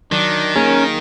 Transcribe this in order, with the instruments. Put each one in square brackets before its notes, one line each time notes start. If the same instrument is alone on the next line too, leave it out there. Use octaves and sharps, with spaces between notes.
[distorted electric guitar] D#3 [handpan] F#3 [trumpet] D4
[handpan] A#3 G#4 [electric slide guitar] C#4 [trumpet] A#4